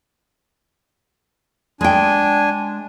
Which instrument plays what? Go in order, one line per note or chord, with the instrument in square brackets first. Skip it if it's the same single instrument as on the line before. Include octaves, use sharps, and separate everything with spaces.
[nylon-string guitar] G#3 G5 [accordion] D4 G#5